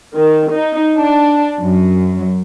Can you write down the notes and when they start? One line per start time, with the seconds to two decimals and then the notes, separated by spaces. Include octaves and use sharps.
0.16 D#3
0.52 D#4
0.98 D4
1.61 F#2